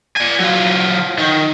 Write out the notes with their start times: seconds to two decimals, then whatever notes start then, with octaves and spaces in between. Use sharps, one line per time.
0.17 D5 G#5
0.40 F#3 F4
1.18 D#3